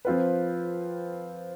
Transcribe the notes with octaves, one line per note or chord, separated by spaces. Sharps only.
F3 C4 F4 B4